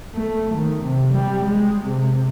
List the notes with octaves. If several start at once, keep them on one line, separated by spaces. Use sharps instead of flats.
A3
D#3
C3
G3
G#3
C3